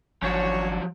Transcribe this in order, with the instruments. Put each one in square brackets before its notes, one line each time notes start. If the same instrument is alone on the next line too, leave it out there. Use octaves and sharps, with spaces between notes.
[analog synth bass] G#1 [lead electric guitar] F3 F#3 [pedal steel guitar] C#4 D4 F#4 [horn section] C#5